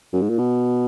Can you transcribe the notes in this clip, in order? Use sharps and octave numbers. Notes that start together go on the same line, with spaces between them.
F#2
G#2
A#2
B2